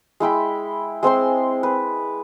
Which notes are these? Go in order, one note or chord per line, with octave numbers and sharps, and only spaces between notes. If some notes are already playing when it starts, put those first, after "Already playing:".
G#3 E4 G5 B5
G#3 C4 C5 C6
B4